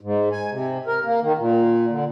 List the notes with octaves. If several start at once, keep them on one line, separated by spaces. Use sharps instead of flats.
G#2
G#5
C3
A#4
A#3
D#3
A#2
D3